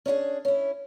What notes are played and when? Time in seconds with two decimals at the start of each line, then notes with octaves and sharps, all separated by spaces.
0.06 C#4 D4 E4 G#4
0.45 C#4 E4